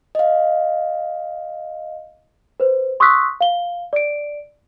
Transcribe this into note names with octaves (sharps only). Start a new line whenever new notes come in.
D#5 F5
B4 C5
C6 C#6 D#6 E6 F#6 B6
F5 G7
D5 D7